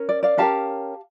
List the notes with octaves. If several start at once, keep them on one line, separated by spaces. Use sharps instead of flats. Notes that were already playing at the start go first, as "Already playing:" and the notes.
Already playing: C#4 A#4
D5
D5 F5
C#4 G4 A#4 F5 A5